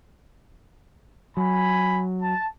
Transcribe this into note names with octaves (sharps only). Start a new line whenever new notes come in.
F#3 G#5 B5
A5